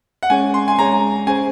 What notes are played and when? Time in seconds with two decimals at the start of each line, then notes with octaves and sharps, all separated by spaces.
0.23 F#5
0.30 G#3 C#4 G#4 C#5 G#5
0.54 C6
0.68 G#5
0.79 G#3 C#4 G#4 C#5 A#5
1.27 C#4 G#4 C5 G#5